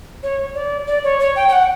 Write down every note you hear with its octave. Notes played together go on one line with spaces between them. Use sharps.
C#5
D5
D5
C#5
C#5
G5
G5
F#5